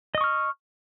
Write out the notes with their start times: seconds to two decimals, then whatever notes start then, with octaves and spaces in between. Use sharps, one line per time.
0.15 D#5
0.18 D#6
0.21 C#6
0.24 F6